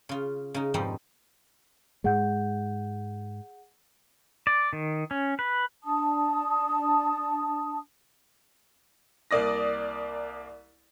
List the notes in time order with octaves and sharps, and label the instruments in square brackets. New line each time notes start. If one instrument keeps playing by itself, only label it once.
[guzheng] C#3 F4
C#3 D#4
F2 G#2 B2 F3 G3 D#4
[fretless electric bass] G#2 G#3 [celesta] G#4 F#5 G6
[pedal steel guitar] D5
D#3
C#4
B4
[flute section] D4 A5 D#6
[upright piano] C2 A#3 D5 D#6 A#6